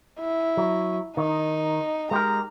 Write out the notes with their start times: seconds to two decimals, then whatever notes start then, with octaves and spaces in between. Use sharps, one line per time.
0.20 E4
0.57 F#3
1.17 D#3 D#4
2.11 G#3 G4 A#4 A#5